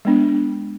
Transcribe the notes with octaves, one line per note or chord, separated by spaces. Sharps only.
G#3 B3 D4